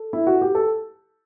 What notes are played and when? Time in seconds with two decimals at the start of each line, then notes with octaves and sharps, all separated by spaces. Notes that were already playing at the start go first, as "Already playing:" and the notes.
Already playing: A4
0.13 E4
0.27 F#4
0.41 G4
0.55 A4